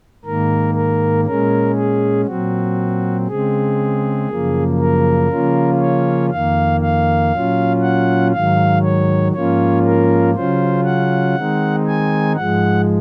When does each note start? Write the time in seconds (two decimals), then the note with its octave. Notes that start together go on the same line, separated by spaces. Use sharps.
0.25 G#2 D#3 A#3 A#4
0.75 A#4
1.25 A#2 G#3 C#4 A#4
1.76 G#4
2.26 A#2 F#3 C4 F#4
3.28 C#3 G#3 C4 G#4
4.28 F#2 C#3 F3 A#3
4.79 A#4
5.30 C#3 F3 A#3 C#4 F4
5.81 C#5
6.31 F2 D#3 A#3 F5
6.82 F5
7.32 A#2 F#3 C#4 F4
7.82 F#5
8.33 G#2 D#3 F#3 F5
8.83 C#5
9.34 G#2 F3 A#3 C#4 F4 C#5
9.85 A#4
10.35 C#3 F#3 C#4 F4 C5
10.85 F#5
11.36 D#3 G#3 C4 D#4
11.86 G#5
12.36 G#2 F3 G#3 F#5